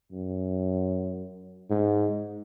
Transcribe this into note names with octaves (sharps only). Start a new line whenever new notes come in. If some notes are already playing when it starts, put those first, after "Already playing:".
F#2
G#2